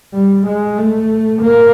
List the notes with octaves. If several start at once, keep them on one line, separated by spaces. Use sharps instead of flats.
G3
G#3
A3
A#3